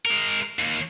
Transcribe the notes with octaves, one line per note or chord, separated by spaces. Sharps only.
G#3 A#4
D#2